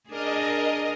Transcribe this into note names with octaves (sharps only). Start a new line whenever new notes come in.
D4 G#4 A#4 D#5